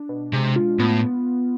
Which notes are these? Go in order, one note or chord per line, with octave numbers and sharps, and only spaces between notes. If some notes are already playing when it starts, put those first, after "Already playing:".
Already playing: D4
B2
C3 G#3
F4
A2 B3